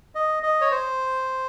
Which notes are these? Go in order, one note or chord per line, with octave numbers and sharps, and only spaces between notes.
D#5
D#5
C#5
C5